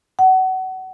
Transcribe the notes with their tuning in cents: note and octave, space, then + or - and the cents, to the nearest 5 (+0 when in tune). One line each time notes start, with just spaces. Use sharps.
F#5 +25